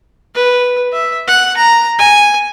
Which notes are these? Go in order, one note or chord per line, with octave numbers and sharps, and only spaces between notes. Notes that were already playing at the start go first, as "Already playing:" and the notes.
B4
E5
F#5
A#5
G#5